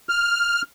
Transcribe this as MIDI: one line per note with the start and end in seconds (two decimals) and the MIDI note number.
0.09 0.62 89